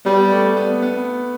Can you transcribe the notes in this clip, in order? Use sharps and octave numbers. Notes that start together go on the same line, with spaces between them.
G3 B3
A3
B3
B3